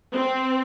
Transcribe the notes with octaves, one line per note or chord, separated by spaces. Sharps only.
C4